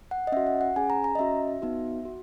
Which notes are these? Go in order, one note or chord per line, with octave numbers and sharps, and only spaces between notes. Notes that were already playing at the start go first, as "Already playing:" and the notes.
F#5
D#5
C#4 F#4 E5
F#5
F#5
C#4 G#4 G#5
A#5
A#5
D#5
C#4 F#4 E5
B3 D#4 F#4
F#4